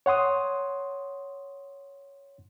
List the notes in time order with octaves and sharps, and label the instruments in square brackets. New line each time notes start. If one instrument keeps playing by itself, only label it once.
[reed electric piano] C#5 F#5 C6 D#6